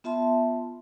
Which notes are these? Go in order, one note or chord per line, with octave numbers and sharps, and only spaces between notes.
B3 F4 E5 A5 C6